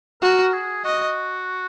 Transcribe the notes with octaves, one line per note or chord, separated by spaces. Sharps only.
F#4 A#4
G#4
F#4 D#5